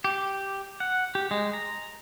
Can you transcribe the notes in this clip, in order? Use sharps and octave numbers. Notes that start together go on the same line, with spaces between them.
G4
F#5
G4
G#3
A#5